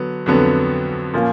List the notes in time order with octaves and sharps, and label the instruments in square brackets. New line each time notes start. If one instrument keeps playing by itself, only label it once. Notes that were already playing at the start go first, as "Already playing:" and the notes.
Already playing: [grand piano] D3 F#3 B3
F2 D3 F#3 B3
A#2 F3 A#3 C#4